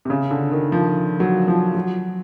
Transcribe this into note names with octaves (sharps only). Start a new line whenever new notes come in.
C3
C#3
D3
D#3
F3
F#3
F3
F#3